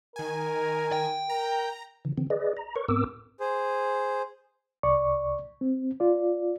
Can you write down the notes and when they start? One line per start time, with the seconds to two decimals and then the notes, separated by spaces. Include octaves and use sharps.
0.16 D#3 A#4 G#5
0.92 G5
1.30 A#4 A#5
2.05 C#3 E3
2.18 D3 E3 C4
2.30 G#4 B4 D5 D#5
2.57 A#5
2.76 A#4 B4 C#5 C#6
2.89 G#2 B3 C4 A#4 D6 E6
3.40 G#4 C5
4.83 C2 D5 C#6
5.61 C4
6.00 F4 D5